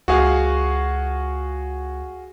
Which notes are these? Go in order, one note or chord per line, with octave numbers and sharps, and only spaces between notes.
C#2 F#4 G#4 F5